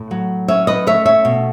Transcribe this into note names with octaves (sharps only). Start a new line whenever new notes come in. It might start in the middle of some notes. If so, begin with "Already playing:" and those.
Already playing: A2
F#3
C#4 C#5 E5
B4 D#5
A3 C#5 E5
C#5 E5
B2